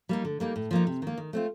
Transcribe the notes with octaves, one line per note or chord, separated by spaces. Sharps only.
G3 A#3 D#4
D3
G3 A#3 D#4
A2
F3 A#3 D#4
C3
D#3 A#3
D#3
A3 C4 F4